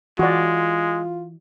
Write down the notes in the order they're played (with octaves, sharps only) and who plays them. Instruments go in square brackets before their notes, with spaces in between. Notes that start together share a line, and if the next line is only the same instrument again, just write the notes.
[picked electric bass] E3 [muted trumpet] G#3 [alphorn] F4 [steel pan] F#4 D5